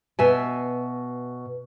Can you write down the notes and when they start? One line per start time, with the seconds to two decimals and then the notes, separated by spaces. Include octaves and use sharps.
0.19 B2 E5 G#5